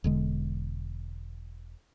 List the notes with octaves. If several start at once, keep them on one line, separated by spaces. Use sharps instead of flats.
E1 D3 G#3